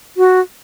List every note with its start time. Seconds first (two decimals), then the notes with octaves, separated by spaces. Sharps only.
0.17 F#4